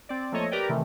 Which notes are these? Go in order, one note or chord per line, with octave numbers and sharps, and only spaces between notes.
C4 D5
F3 A3 A#3 A4 C#5 D#5
G4 A#4 B4 D5 G5
C3 D#3 E3 A3